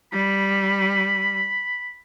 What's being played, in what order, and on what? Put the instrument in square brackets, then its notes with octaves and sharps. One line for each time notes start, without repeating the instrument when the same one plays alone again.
[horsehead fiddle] G3 [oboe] B5